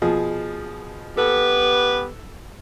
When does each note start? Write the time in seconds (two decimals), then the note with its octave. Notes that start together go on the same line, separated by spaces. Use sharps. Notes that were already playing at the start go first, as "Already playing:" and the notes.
0.02 B2 F3 G#4
1.17 B3 G4 A4 B4